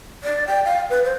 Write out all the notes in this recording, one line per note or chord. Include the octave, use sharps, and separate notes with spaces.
D5
G5
F5
B4
C5